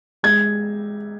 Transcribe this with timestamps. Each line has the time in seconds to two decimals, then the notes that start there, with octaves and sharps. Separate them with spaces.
0.23 G#3 G#6